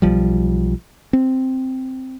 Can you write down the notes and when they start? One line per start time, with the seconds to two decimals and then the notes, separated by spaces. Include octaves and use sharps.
0.02 B1 F3 G3
1.13 C4